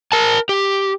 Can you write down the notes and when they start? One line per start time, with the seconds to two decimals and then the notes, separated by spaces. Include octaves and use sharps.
0.12 A#4 A5
0.49 G4